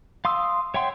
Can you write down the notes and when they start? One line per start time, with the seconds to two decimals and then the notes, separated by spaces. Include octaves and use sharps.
0.25 F5 C6 D#6 E6
0.74 C#5 E5 F#5 G5 C6